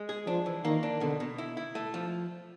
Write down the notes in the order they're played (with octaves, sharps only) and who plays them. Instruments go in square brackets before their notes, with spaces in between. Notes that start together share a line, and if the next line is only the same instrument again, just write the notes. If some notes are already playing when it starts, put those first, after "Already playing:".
Already playing: [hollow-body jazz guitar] G#3
G#4
[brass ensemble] F3 [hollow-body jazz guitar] D4
[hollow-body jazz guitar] E3
[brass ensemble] D#3 [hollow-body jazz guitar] A#3
[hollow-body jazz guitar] D4
[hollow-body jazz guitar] B2 [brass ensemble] D3
[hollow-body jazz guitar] B2
E4
E4
A3
F3